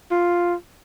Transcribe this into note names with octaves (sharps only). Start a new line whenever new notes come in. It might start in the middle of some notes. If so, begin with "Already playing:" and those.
F4